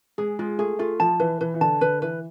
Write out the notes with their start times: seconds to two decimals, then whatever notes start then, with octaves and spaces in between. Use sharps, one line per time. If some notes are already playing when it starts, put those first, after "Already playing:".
0.18 G#3 G#4
0.39 G#3 F4
0.59 A3 G#4
0.79 A3 F4
1.00 F3 A5
1.20 E3 B4
1.41 E3 B4
1.54 E3
1.61 D3 A5
1.81 D3 B4
2.02 E3 B4